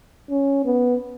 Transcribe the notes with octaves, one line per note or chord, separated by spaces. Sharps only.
C#4
B3